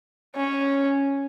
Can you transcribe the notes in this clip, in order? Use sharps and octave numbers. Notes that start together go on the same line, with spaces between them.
C#4